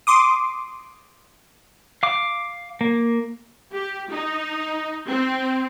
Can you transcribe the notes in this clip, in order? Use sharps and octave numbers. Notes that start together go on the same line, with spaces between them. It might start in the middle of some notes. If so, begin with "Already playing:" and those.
C6 D6 D#6
F5 D6
A#3
G4
D#4
C4